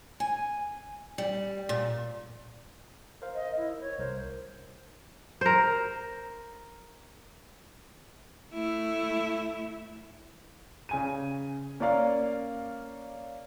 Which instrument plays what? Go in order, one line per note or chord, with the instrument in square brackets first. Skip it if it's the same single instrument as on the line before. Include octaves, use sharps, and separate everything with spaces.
[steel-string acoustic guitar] G#5
G3
A#2
[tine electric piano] A#4 C5 F5
[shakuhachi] D#5
E4
C#5
[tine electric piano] C2 A#4 [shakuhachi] C5
[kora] A#4 C5
[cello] A3 E4
[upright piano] C#3 G#5 D#7
A#3 C#4 A#4 D5 F5